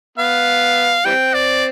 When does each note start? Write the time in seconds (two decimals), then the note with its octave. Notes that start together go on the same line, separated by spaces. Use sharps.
0.18 B3 F5
1.05 E3 G3 C4 G5
1.34 D5